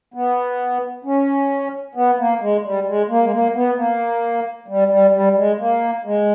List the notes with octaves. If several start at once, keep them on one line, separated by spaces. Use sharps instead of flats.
B3
C#4
B3
A#3
G#3
G3
G#3
A#3
G#3
A#3
B3
A#3
G3
G3
G3
G#3
A#3
G#3